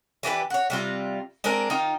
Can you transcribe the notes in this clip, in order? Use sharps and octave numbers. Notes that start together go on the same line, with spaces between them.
E3 D4 G4 B4
F#4 C#5
C3 G3 F4
G#3 C4 D4 A#4
D#3 D#4 F4